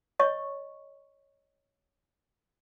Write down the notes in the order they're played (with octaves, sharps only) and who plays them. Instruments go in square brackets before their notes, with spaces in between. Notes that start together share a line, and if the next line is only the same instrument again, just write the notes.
[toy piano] C#5 D#5 C#6